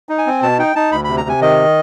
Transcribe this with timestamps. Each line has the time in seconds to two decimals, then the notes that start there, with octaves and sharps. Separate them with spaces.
0.09 D#4
0.18 G#5
0.26 C4
0.42 B2 A5
0.59 D#4 G5
0.76 D#4 A5
0.92 D2 B5
1.04 C3 B5
1.17 A#5
1.25 C3 G#5
1.41 D#3 D#5